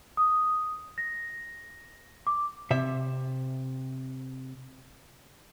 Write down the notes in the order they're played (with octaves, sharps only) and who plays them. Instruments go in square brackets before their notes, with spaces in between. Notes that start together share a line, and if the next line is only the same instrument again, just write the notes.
[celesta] D#6
A#6
D6
[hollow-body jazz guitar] C3 E5